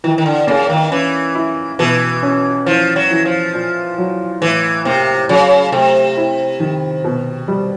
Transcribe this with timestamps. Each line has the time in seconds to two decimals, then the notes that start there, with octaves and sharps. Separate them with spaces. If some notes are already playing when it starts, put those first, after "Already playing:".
0.04 D#3 E3
0.18 D#3
0.26 D3
0.47 C#3 A#3
0.70 D#3
0.91 E3 C#4
1.35 E4
1.79 B2 E3
2.23 C#4
2.66 E3 F3
2.96 F#3
3.11 E3
3.25 F3
3.54 A#2
3.98 F#3
4.41 A2 E3
4.85 C3 A#3
5.29 C#3 F#3
5.72 C3 A3
6.17 E4
6.60 D#3
7.04 B2
7.48 G3